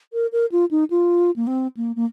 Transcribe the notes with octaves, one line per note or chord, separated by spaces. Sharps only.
A#4
A#4
F4
D#4
F4
A#3
C4
A#3
A#3